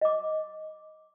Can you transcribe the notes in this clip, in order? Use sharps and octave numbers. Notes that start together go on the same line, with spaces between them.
D#5 D6